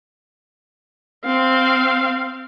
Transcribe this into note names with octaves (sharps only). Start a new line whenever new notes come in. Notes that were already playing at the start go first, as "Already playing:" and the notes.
C4 F5